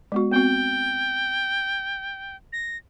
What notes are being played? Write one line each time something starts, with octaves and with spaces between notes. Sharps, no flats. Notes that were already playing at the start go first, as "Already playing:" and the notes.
G#3 B3 F#4
B3 C4 F#4 G5
A#6